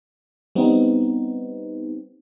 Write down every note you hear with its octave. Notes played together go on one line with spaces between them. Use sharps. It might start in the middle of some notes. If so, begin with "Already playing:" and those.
G3 B3 C4 D#4